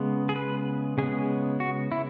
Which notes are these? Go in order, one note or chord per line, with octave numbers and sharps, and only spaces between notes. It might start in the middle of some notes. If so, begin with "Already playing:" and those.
Already playing: C#3 G#3 B3
G#4
B4
C#3 G#3 B3 G#4
F#4
E4